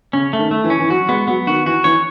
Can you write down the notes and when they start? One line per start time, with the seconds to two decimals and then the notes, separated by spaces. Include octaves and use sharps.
0.13 C#3 C#4
0.33 A3
0.39 D#3
0.51 A3
0.64 E3
0.70 C#4
0.79 E3
0.90 F#3 F#4
1.09 G#3 B3
1.28 F#3 B3
1.47 D#3 F#4
1.66 E3 F#4
1.84 E3 C#5